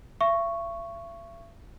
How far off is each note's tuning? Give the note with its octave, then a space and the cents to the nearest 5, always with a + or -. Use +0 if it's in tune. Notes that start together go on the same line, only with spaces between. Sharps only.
E5 +45 C#6 +0